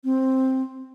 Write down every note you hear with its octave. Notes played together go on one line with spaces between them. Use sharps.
C4